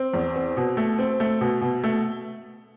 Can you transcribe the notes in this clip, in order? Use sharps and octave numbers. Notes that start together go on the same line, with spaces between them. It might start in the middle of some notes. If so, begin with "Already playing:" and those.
Already playing: C4
E2
C4
B2
A3
C4
A3
B2
B2
A3